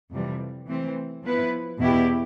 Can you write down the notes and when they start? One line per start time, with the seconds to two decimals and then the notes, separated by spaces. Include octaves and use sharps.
0.11 F2 C3 E3 G3
0.67 E3 A3 C4
1.23 F3 B3 E4 B4
1.79 E2 B2 B3 E4 G4